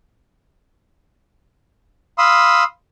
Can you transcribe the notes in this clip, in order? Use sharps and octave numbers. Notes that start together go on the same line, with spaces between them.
F5 B5 C6 D#6 E6